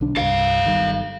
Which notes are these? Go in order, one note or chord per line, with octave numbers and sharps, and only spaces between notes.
B1 D3 D4
C2 G2 A4 F5
G1 D#3 G3